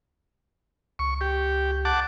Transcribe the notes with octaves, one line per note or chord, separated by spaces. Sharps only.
C#2 C#6
G4
F#5 A5 D6